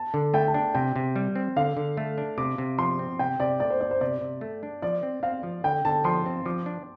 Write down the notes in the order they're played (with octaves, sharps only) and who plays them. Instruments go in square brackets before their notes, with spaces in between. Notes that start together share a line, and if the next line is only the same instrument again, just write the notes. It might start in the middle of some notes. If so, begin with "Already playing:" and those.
Already playing: [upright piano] A5
[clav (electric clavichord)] D3
[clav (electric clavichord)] A3 [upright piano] G5
[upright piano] A5
[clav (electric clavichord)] D4
[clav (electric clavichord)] C3 [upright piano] G5
[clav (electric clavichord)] C3
G3
C4
[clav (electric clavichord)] D3 [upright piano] F5
[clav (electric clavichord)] D3
A3
D4
[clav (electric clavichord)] C3 [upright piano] D6
[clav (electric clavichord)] C3
[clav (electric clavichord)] F3 [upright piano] C6
[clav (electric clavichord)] C4
[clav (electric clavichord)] C3 [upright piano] G5
[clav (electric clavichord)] C3 [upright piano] D5
[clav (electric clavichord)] A3 [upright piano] D5
[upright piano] C5
[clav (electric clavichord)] D4 [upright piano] D5
[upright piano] C5
[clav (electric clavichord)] C3 [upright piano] D5
[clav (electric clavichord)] C3
A3
D4
[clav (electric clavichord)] F3 [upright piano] D5
[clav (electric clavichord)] C4
[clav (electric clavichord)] C4 [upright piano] F5
[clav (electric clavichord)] F3
[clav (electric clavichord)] D3 [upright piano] G5
[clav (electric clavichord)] D3 [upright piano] A5
[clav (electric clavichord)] F3 [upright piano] C6
[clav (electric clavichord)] C4
[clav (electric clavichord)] F3 [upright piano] D6
[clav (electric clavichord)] D4